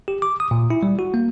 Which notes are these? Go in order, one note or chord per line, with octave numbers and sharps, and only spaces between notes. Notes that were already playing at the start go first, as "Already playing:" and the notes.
G4
D6
D#6
A#2
E4
G3
F#4
A#3